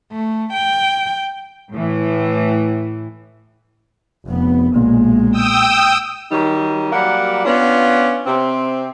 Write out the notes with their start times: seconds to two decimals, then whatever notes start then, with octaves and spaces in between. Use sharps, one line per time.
0.12 A3
0.53 G5
1.70 A2 E3
4.26 F1 B3
4.76 B1 A#2 G#3
5.32 G5 D#6 E6
6.32 D#3 F#3 G3 D#4
6.92 F#3 G3 A#3 F#5
7.45 B3 C#4 D4 F4
8.27 C3 C4